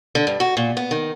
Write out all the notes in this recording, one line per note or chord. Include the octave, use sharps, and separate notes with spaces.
D3
G2
F#4
A#2
B3
D#3